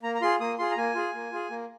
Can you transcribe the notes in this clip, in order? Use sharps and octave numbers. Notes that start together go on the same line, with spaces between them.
A#3 A#5
A#5
F4 G#4 C6
A#3 D#6
F4 G#4 C6
A#5
A#3 G#5
F4 G#4
A#3
F4 G#4
A#3